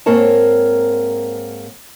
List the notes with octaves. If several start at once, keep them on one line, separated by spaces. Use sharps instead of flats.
G#2 A#3 C4 A#4 C#5 A5